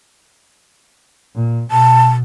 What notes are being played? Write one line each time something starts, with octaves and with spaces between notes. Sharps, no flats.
A#2
B2 A5